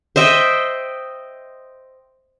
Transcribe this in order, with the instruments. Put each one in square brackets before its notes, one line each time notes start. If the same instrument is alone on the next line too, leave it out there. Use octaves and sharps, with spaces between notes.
[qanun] C5 D#5 E5 G5